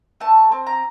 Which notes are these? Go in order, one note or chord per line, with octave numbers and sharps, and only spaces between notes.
A3 A5
C4
A#5